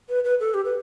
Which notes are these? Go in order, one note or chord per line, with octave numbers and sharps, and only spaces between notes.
B4
B4
A4
G4
B4